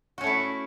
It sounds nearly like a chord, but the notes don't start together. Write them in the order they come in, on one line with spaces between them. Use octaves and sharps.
F#4 C#4 A3 E4